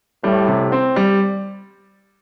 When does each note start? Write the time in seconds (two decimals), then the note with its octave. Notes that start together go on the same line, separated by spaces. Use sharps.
0.24 A2 G3
0.48 C3
0.72 C4
0.96 G3